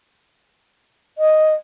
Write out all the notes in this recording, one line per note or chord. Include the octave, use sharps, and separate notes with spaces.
D#5